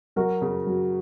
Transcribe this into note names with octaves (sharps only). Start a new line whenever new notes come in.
F#3 F#4 A#4
C#3
F#3